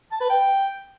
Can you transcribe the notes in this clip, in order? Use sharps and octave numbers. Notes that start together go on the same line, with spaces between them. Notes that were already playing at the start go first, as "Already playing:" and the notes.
A5
B4
G5